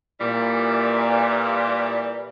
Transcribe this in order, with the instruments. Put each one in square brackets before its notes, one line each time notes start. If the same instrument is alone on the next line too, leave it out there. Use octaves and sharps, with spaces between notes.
[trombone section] A#2 [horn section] E3 G3